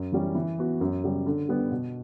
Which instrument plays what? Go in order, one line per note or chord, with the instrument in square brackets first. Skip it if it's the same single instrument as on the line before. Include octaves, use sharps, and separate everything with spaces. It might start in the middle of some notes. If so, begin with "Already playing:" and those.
Already playing: [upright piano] F#2
E3 G3 C#4
E3
B3 F#4
F#2
C#3 G3
D3
G3 B3
B2